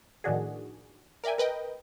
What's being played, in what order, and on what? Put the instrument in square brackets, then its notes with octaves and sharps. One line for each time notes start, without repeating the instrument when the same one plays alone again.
[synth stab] A2 D#3 F3 D4 F#4 G#4
A#4 D5 E5 G5 G#5
A#4 B4 D#5 G5